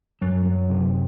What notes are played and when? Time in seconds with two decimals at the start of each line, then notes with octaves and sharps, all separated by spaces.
0.21 F#2 F#3
0.45 F#3
0.70 C3